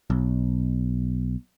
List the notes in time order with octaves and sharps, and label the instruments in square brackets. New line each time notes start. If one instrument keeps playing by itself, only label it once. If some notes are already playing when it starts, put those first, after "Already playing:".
[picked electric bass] B1